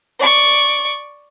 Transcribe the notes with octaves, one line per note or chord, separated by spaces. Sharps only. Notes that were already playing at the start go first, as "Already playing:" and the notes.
D5 C#6